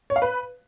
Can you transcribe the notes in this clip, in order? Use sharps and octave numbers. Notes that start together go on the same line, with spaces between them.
C#5
F5
B4